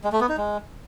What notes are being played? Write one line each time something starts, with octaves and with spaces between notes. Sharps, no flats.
G#3
A3
B3
D#4
G#3